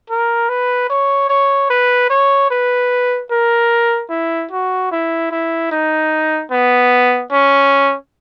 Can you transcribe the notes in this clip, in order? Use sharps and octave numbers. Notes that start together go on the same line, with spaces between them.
A#4
B4
C#5
C#5
B4
C#5
B4
A#4
E4
F#4
E4
E4
D#4
B3
C#4